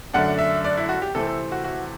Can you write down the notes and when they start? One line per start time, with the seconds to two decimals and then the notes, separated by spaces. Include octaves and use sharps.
0.13 F#2 D3 A3 D4 F#5
0.39 E5
0.65 D5
0.77 E4
0.89 F#4
1.02 G4
1.15 C3 E3 A3 C4 A4
1.27 A4
1.52 F#4
1.64 F#4